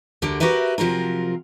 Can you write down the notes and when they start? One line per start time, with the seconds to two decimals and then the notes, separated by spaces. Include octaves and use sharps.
0.22 D2 D3 G4 A#4
0.40 F#4 G4 A#4 B4 E5
0.78 C3 F3 F#3 F4 A#4